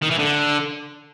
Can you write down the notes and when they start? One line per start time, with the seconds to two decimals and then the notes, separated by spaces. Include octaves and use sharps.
0.03 D#3
0.11 E3
0.19 D3